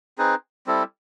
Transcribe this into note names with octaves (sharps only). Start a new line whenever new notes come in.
C4 D#4 G#4 B4
G3 C4 E4 A4